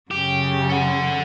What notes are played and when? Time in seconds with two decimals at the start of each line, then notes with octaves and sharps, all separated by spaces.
0.11 F#2 C#3 G4
0.70 A4 F#5